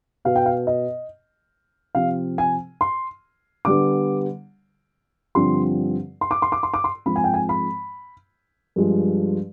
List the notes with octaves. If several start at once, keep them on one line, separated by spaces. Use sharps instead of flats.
B2 B3 F5
G5
F5
D#5
C3 F3 C4 F5
G#5
C6
D3 G3 B3 D6
G2 D3 F3 C4 C6
C6
D6
C6
D6
C6
D6
C6
G#2 F3 C4 B5
G#5
G5
G#5
B5
G2 F3 G#3